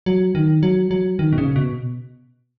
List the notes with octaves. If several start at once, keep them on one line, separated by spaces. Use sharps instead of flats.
F#3
D#3
F#3
F#3
D#3
B2
C#3
B2